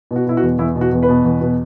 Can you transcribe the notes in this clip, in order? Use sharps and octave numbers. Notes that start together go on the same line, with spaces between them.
B2
F#4
B2 E4
F#4
E2
E2 E4
B2
F#4
E2
B4
B2
E2
B2